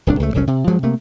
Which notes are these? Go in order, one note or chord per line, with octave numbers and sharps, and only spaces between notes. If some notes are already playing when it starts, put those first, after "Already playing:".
D1 C2 D4
C#2 A3
F1 C2 F#3 C#4
C3
G2 F3 F#3 G#3
C3 A3 A#3